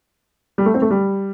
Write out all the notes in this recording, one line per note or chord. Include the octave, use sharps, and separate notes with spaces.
G3
A3
C4
A3
G3